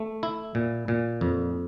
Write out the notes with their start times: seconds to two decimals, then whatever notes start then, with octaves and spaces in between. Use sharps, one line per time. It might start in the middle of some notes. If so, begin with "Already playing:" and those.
Already playing: A3
0.23 E4
0.55 A#2
0.88 A#2
1.21 F2